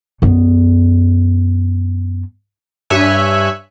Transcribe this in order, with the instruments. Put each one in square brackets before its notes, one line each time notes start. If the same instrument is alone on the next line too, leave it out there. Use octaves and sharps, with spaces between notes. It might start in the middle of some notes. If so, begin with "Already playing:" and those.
[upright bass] F#2 B3
[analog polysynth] G2 C#5 E5 G#5 F#6